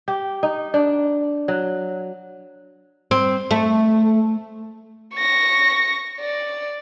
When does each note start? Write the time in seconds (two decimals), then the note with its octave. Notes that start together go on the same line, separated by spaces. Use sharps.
0.08 G4
0.43 D#4
0.74 D4
1.48 F#3
3.11 C4
3.51 A3
5.16 C#6 A#6
6.20 D5